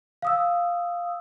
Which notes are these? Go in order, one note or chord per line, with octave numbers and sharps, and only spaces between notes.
F5 D#6 E6